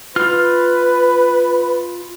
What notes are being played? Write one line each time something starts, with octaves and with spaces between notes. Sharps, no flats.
F4 B4 F6